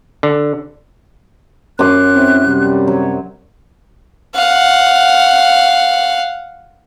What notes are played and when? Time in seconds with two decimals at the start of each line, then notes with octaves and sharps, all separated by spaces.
0.23 D3
1.79 F#2 C6 D6 F#6
2.15 C4 E4
2.47 C3 G3
2.87 F#3 C#5
4.35 F5 F#5